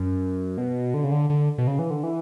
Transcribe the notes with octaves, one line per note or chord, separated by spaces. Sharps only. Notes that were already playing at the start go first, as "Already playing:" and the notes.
Already playing: F#2
B2
D3
C#3
D3
D3
B2
C#3
E3
D3
E3